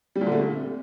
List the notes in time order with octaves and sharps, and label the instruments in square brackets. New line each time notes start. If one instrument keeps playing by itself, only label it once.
[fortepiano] G3
A#2
D3
A3
C3